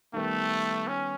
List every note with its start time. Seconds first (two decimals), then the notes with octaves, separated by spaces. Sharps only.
0.13 D#3 G3 A3 B3
0.87 C#4